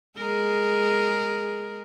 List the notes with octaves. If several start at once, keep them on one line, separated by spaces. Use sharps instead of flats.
G#3 G#4 A#4